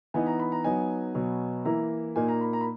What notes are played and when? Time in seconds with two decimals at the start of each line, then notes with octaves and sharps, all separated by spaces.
0.14 E3 B3 D#4 G#5
0.26 A#5
0.40 B5
0.52 A#5
0.64 F#3 B3 D#4 G#5
1.15 B2 F#3 B3
1.65 E3 A#3 E4 A#5
2.16 A#2 A#3 D#4 G#5
2.28 A#5
2.41 B5
2.53 A#5
2.61 B5